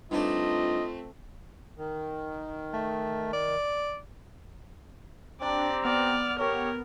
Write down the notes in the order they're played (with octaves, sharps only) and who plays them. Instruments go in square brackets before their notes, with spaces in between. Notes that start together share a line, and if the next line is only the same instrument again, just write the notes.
[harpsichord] G2 D#4 D5 [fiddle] A3 C4 [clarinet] F4 [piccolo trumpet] D#5
[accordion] D#3
[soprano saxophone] A3
D5
[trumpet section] C4 G4 A#5 [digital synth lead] D4 [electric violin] D5
[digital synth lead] B3 [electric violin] D5 F6
[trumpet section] G4 C#5 [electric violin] A#4